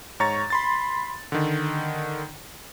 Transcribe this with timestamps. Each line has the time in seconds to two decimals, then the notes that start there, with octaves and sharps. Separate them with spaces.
0.20 G#2 C#5 A#5 C#6 A6
0.50 B5 C6 A6
1.32 D3 D#3